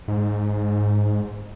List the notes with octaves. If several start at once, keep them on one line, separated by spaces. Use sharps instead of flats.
G#2